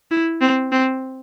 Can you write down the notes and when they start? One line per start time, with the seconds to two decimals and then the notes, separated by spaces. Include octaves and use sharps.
0.11 E4
0.41 C4
0.72 C4